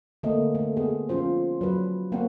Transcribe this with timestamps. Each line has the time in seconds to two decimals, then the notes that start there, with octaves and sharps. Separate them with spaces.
0.23 D3 A3 A#3 C4 D#5
0.55 A3
0.77 B3 G#4
1.09 F3 C#4 F4 C5
1.61 F#3 B4
2.12 A#3 C4 C#5 F#5